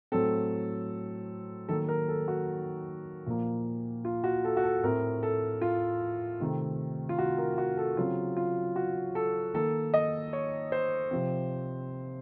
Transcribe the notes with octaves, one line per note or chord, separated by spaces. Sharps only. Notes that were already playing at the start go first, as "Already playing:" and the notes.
A2 F#3 A3 C4 A4
D#3 F#3 A#3 A4
A#4
A4
F#4
A#2 F3 A#3
F4
F#4
A4
F#4
A4
A2 A3 C4 A#4
A4
F4
C3 D#3 A3 C4
F4
F#4
A#4
F#4
A4
C#3 F#3 C4 F4
F4
F#4
A4
D#3 A#3 A4
D#5
C#5
C5
C3 F3 C4